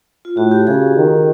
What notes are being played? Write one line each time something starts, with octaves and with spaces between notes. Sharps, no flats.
F4
A2 F#4
G4
C#3 G#4
D#3